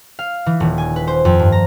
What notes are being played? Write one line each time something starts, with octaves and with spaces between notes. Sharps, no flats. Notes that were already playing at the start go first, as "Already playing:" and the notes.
F5
E3
D#1
G#5
B4
C5
F2
G2
A#5